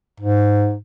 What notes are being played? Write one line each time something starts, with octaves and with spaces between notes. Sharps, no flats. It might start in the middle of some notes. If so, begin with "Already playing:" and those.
G#2